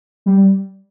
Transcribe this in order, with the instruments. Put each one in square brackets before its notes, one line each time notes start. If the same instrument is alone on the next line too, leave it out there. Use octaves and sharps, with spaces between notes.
[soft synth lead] G3